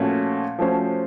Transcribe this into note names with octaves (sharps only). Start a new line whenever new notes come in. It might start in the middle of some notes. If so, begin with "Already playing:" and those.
Already playing: A#2 F3 A3 C#4 F#4
F3 A3 C#4 F#4 C5